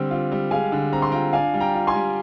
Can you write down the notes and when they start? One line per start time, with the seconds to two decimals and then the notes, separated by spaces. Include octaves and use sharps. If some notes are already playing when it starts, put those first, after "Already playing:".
Already playing: D3 G3 C4
0.11 F4
0.32 G3
0.51 G#3 F5 G#5
0.72 D3
0.93 C4 A#5
1.02 C6
1.11 F4 G5 A#5
1.33 D4 F5 G#5
1.54 G3
1.60 G5 A#5
1.74 F4
1.87 G#5 C6
1.95 G3